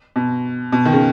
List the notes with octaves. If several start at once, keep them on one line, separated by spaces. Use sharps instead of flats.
B2
B2
D#3
C#3